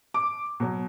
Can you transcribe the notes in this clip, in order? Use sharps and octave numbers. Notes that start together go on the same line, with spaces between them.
D6
B2 F#3